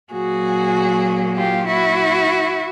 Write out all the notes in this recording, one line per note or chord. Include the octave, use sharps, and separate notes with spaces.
A#2 F#3 A#3 F#4 G#4
F4 G4
E4 F#4